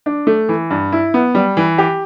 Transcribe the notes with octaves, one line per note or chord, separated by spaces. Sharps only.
D4
A3
E3
G2
E4
B3
G3
E3
G4